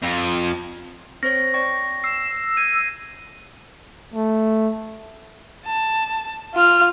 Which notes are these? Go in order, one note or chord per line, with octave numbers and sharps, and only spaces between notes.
F2
C4 C5 C#5 A#6
D5 G5 C#6
E6 C7
G6 G#6 D#7
A3
A5
F4 F6